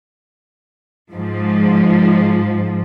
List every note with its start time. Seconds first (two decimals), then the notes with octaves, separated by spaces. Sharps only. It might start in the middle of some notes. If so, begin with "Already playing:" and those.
1.12 G#2 F3